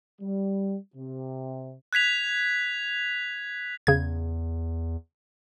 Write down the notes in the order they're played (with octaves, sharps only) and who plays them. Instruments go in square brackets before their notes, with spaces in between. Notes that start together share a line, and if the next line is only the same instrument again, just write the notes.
[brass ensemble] G3
C3
[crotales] F#6 G#6 B6 F7
[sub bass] E2 [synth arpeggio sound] C#3 G#6